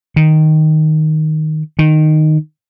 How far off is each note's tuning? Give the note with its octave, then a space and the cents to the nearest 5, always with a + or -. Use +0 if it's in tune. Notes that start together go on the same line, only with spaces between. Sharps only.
D#3 +0
D#3 -10